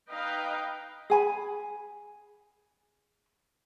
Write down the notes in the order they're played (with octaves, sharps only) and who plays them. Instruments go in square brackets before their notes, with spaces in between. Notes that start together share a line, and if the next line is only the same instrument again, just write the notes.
[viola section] D#4 B4 D#5 F5 G5
[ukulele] G#4 G#5 B5